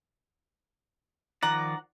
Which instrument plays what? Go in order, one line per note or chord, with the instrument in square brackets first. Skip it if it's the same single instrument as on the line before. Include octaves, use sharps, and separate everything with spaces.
[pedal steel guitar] D#3 F3 D5 [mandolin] F#5 A#5